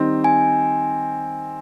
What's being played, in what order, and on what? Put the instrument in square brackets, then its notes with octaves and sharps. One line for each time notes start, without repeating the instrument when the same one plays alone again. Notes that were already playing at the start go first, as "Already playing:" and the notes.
Already playing: [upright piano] D#3 G3 C4 D#4
[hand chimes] G#5